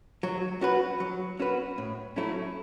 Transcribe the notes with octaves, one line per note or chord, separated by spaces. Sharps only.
F#3
C#4 F#4 B4
F#3
C#4 F#4 B4
A2
F#3 A3 C#4 E4